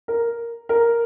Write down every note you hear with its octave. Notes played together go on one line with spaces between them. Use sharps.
A#4
A#4